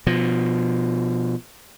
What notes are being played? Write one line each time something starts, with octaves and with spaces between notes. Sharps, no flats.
B2 F3